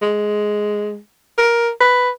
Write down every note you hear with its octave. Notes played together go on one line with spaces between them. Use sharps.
G#3
A#4
B4